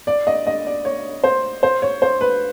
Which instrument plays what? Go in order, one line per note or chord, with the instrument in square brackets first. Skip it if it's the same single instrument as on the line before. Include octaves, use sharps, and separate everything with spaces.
[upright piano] D5
D#5
D#5
D5
C#5
C5
C5
C#5
C5
B4